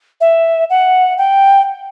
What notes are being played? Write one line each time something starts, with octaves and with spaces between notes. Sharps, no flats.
E5
F#5
G5